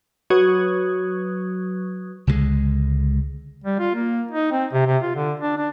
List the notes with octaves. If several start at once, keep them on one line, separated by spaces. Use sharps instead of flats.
F#3 B4 C#6 D#6 F#6 G#6
C#2 D3 E3 G#3
G3
F4
A#3
D#4
C4
C3
C3
F4
D3
D4
D4